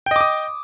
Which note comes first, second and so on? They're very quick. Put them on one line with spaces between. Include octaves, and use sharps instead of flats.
G5 D#5 D6 D#6